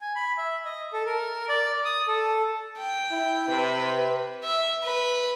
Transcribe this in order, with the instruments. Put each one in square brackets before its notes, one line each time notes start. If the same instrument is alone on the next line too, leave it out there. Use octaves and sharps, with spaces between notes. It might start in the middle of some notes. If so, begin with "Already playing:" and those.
[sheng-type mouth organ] G#5
B5
E5
D#5
A4
A#4
D5
D#6
A4
[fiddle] G5
[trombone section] E4
[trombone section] C3 [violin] B4
[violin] E5
B4